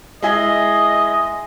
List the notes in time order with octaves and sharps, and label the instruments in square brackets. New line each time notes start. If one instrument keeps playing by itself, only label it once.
[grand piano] G#3 E4 G#4 [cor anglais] D#5